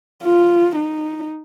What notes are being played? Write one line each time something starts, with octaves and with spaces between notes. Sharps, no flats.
F4
D#4